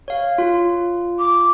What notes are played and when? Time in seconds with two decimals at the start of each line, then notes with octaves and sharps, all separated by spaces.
0.08 C#5 F5
0.38 F4
1.19 D6